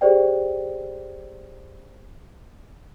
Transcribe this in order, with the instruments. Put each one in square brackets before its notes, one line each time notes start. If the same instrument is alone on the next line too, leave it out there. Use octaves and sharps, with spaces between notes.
[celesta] G4 G#4 C5 D5 G5